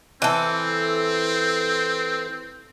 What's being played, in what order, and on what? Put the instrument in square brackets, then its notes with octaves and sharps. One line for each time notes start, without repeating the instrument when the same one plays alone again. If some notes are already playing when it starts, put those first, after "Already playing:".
[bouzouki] E3 A4 [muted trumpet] C4